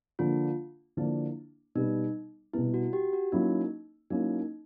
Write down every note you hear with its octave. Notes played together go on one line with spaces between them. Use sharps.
D3 F3 A#3 D4 F4
D3 F3 A#3 D4 E4
B2 G3 B3 D#4
B2 G3 B3 E4
F#4
G4
F#4
F#3 A#3 C#4 D#4 E4
F#3 A#3 C#4 D#4 E4